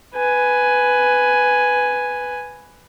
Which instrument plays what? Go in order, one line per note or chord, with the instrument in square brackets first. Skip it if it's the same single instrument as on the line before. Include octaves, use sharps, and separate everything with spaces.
[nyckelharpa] B4 G#5